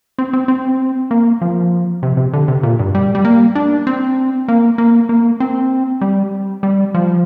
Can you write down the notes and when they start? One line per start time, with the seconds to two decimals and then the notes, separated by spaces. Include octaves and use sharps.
0.19 C4
0.33 C4
0.48 C4
1.11 A#3
1.41 F3
2.03 C3
2.17 C3
2.33 D3
2.48 C3
2.63 A#2
2.79 G2
2.95 G3
3.15 G3
3.25 A#3
3.55 D4
3.87 C4
4.48 A#3
4.78 A#3
5.09 A#3
5.40 C4
6.01 G3
6.63 G3
6.94 F3